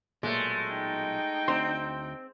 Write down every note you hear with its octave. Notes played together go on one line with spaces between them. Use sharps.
B1 A#2 G#3 A3
D#4 G5
D2 C4 A#5 C6